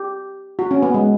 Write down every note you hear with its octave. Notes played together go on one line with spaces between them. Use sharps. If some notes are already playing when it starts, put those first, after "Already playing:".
Already playing: G4
F#4
C#4
B3
G#3